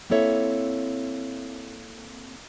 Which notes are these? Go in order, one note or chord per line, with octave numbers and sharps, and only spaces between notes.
A#3 C4 E4 A4 C#5 E5